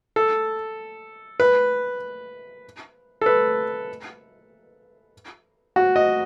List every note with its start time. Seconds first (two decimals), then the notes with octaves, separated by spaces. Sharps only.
0.16 A4
1.40 B4
3.21 A4
3.26 B4
5.76 F#4
5.96 D#5